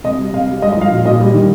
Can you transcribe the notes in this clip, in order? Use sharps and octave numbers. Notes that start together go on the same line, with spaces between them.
C3 D#5
G3
C3 F5
G3
G#3 D#5
D#5
F3 F5
A#2
A#2 D#5
G3
D#3